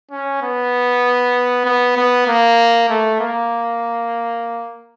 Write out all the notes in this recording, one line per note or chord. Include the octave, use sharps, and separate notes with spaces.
C#4
B3
B3
B3
A#3
A3
A#3